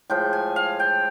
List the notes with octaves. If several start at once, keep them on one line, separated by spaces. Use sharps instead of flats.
A2 F3 G#3 G5
G#5
F5
G5